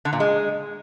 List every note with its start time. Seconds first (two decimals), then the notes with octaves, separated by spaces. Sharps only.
0.05 D3
0.13 A#2
0.20 G#3